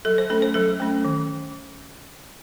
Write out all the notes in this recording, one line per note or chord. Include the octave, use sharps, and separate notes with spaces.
F#3 A4
C5
A3 C#4 A4
C5
F#3 A4
A3 C#4
D#3